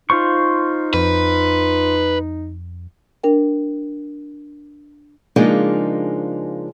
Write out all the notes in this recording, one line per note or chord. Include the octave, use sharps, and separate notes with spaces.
D#4 F4 C5 C#6
F2 B4
D4 A#4 G5
C#3 F3 G#3 A#3 D4 D#4